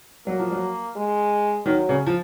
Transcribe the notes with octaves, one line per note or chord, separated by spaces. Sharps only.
F#3 A#3
F3
F#3
G#3
D#3 F#3
C#3
F3